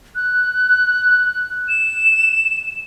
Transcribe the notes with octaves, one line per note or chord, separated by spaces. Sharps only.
F#6
E7